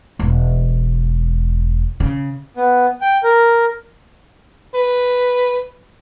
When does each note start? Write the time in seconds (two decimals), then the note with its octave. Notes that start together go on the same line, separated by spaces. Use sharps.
0.19 E1
2.00 C#3
2.55 B3
3.01 G5
3.24 A#4
4.75 B4